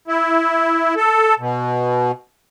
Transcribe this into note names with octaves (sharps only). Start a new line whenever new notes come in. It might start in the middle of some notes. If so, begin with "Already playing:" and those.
E4
A4
B2